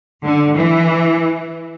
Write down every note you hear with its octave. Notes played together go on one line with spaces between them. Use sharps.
D3
E3